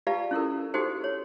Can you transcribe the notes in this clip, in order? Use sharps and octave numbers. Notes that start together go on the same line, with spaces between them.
F4 G4 B4 D5 F5 A5
C#4 E4 A4 A#4
D#4 F#4 G4 A4 C5 G5
C#5